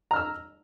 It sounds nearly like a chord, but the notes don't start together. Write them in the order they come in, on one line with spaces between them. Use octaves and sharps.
A#5 F6 E6